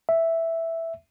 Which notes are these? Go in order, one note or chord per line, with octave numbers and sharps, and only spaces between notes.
E5